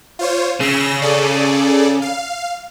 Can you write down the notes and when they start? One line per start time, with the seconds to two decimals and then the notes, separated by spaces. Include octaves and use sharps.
0.19 F4 C5 C#5
0.61 C#3 E6 A#6
1.02 G#4 A4 D5
2.02 F5